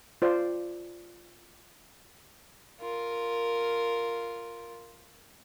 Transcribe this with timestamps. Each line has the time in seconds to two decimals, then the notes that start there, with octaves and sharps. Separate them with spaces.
0.22 F4 C5 D5
2.81 F4 A#4